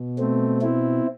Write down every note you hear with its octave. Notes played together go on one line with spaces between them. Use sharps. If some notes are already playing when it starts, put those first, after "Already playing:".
Already playing: B2
A3 C4
C4 E4